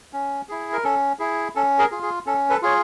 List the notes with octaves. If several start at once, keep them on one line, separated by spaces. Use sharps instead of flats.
C#4
E4 G#4
A#4
C#4 A4
E4 G#4
C#4 A4
G#4 A#4
F4 G#4
G#4
C#4 A4
A4 B4
F4 G#4 C#5